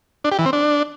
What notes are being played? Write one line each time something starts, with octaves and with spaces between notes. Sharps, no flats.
D4
G4
E3
C4
D4